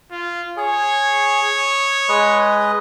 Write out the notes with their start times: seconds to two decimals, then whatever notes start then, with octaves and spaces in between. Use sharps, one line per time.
0.11 F4
0.57 G#4 C#5
1.57 D#6
2.09 G#3 B4 D#5